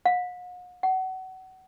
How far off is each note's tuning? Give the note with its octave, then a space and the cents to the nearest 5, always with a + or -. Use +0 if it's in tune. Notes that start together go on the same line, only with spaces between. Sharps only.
F#5 -45
F#5 +25